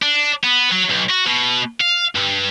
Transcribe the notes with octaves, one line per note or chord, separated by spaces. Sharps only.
D4
B3
F#3
B1
F#4
B2
F5
G2